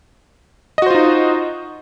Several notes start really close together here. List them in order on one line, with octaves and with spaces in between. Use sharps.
D#5 F#4 C5 F4 D#4